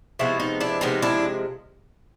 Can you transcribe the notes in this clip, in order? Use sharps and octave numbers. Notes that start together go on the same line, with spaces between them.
C3 F3 G#3 B3 E4 F#4
D#4
D4 E4
C3 F3 G#3 B3 D#4
D4 E4